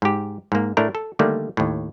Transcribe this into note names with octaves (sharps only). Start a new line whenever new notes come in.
G#2 G4
G#2 A#3
A2 A3 D4 A#4
A4
D3 D#3 G3 A3 A#3
D#2 A2